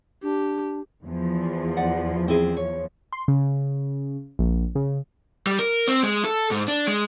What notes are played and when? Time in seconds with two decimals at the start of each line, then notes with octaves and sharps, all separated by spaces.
0.23 D4 G4
1.04 E2 F3
1.77 D5 F#5
2.28 C4 E4 G#4
2.57 C#5
3.13 C6
3.28 C#3
4.39 A#1
4.75 C#3
5.47 G3
5.59 A#4
5.87 C4
6.03 G#3
6.25 A4
6.51 G#2
6.68 D4
6.88 G#3